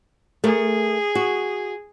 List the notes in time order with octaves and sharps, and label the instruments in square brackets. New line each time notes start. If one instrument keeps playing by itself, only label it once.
[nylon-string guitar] A3 A#4 [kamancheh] G#4
[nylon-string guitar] F#4